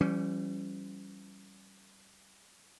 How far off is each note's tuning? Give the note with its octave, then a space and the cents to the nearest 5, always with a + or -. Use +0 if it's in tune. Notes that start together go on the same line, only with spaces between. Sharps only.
E3 +40 G3 -15 C#4 +0